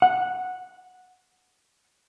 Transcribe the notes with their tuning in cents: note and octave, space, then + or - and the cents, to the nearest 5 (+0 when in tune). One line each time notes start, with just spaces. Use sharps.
F#5 -10